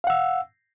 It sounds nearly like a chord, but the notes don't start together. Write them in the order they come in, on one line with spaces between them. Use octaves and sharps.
F5 F#5 E6